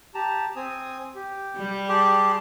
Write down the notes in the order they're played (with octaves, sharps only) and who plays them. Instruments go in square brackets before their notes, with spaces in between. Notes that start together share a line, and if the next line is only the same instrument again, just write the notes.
[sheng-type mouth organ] G4 A5 A#5
C4 G#5 D#6
G4
[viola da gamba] G3
[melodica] G4 [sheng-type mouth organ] G#4 A5 C6